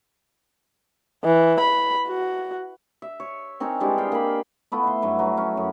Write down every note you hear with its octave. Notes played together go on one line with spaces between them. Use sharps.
E3
B5
F#4
E5
C#5
C4 C#4 D#4 A#4
E3 G3 G#3 D4
G#4 F5 G5
A#3 B5
A3 B3 E4 F4
E5 C6
G2 F#3 B4 C#5
F#3
C#4
F#2